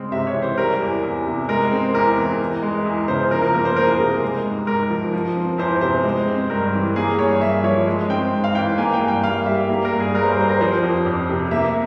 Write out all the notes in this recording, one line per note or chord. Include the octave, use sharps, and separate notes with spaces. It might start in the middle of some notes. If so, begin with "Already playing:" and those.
Already playing: C#3 G#3 C4
C3 E5
C#5
E3
C5
G3 A#4
E2
E2
C3
G#3 A#4
C4
E2 A#4
E3
E3
G#3
E2
C#3 C5
F3 A#4
A#4
A#3 A#4
C5
E2 A#4
G#4
C3 A#4
G#3
G#2
G#2 A#4
F3
F3
C4
E2 C5
C3 C5
G#3
C4
G2 A#4
E3
A#3 G#4
G2 C#5
G2 E5
F3 C#5
G#3
C4 G5
G#2
F5
E3 G5
A#3 G#5
G5
G2
G5
G2 F5
G3 E5
A#3
A#4
G2
G#4
G2 A#4
C5
A#4
G3 C5
A#4
F3 C5
F2
F2
C3
A#3 E5